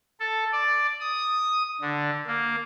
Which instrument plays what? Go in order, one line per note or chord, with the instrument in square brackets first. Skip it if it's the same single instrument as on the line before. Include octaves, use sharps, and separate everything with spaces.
[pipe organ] A4
D5
D#6
D3
A#3